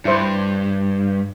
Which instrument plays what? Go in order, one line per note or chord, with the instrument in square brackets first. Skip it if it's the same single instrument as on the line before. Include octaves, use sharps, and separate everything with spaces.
[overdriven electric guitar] G2 [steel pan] E4 C5